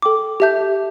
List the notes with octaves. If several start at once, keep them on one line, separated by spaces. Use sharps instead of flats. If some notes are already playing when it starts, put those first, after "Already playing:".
A4 G5 D6
G4 E5 A5 G6